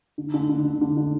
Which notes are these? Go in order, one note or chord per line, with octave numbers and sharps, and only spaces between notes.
D3
D3
D3
D3
D3
D3